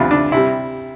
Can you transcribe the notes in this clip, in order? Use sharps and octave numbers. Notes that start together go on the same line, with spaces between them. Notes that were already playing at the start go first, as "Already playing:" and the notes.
Already playing: D2 C3 E3 B3 D4 E4 F4
D4
C3 G3 E4